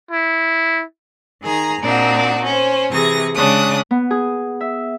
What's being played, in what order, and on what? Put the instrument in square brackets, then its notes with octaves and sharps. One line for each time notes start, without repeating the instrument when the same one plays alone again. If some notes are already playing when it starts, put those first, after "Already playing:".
[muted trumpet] E4
[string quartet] D#3 G#4 A#5
A#2 C4 D4 D#4 F#4
C#4 C5
C3 E3 G#4 C#6 A#6
C#3 G#3 D4 D#6 F#6
[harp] B3
G#4
E5